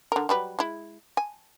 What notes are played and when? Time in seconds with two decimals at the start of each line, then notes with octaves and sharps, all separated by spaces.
0.12 D3 A#4
0.29 F#3 G3 B4
0.59 G#3 E4
1.17 G#5